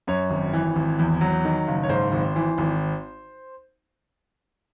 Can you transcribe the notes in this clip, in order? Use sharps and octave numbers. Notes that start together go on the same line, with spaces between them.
F#2 C#5
G#1
E3
G#1
E2
F#3
D#3
F#1
C#5
G#2 C5
G#1
E3
G#1